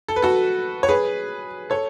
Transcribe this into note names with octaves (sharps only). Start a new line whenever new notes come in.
A4
B4
F#4 A4
C#5
G#4 B4
A4 C#5